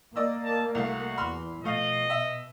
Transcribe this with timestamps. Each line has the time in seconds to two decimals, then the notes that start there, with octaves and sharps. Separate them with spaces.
0.16 A#3 D5 D#5 E6
0.44 A5
0.75 C2 A3 F#4 F5
1.18 E2 B5 C6 F6
1.64 B2 F3 A3 D#5 F5
2.10 E5